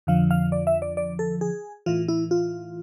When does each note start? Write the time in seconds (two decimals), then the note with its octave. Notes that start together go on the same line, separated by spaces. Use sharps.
0.07 F2 D3 F3 F5
0.31 F5
0.52 D5
0.67 E5
0.82 D5
0.97 D5
1.19 A4
1.41 G#4
1.86 A2 E3 F4
2.08 E4
2.31 F4